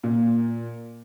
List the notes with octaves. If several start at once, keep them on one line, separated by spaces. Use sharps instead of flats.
A#2